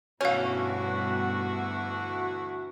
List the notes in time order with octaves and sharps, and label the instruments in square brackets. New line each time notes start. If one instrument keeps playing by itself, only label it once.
[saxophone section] D2 E3 F#4 [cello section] G2 B2 [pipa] C#4 [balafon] C#5 F5